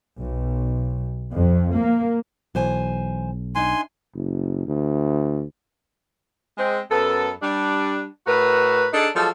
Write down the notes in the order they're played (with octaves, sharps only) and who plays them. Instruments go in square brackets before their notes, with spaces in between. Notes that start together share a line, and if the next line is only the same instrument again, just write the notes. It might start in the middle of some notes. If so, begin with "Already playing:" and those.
[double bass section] B1
F2
A#3
[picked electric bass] B1 [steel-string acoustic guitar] E3 C5 G#5
[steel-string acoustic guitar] D4 D#4 E5 [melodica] G#5 C6
[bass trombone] F#1
D2
[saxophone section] G#3 C4
F#2 B3 A4
G3 D4
A2 F#4 A#4 B4
D4 D#4 G#4 A4
F3 F#3 G#3 A4